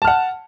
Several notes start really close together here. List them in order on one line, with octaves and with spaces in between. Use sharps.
A5 F6 F#5